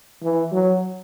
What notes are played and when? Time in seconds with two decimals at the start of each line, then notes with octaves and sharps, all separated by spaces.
0.23 E3
0.52 F#3